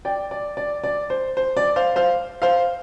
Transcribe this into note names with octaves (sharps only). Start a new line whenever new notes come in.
D5 G5
D5
D5
D5
C5
C5
D5
C5 F5
C5 F5
C5 F5